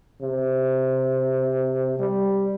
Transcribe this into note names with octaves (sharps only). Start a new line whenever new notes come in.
C3
G3